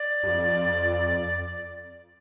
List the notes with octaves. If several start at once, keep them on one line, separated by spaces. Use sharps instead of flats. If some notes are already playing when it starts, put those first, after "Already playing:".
Already playing: D5
G2
F2